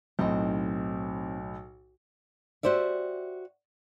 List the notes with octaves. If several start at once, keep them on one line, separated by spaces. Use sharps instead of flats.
B1 A2 C4 D#4 D#5
F#4 G4 C5 D5 E5